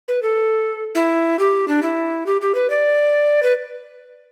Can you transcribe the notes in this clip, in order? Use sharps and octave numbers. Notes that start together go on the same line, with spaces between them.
B4
A4
E4
G4
D4
E4
G4
G4
B4
D5
B4